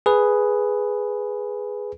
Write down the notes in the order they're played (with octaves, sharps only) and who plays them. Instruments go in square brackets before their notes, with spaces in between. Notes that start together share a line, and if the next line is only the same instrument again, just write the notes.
[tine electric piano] G#4 B4